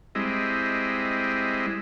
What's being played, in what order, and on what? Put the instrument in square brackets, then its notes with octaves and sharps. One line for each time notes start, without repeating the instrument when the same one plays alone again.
[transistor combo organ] G3 G#3 C4 E4 D#5